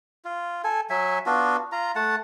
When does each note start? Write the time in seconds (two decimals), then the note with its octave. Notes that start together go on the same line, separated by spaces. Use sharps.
0.25 F4
0.64 A4 G#5
0.90 F#3 E5 G#5
1.26 B3 D4 F4 F#4
1.72 F4 A#5
1.96 A3 F#5 A5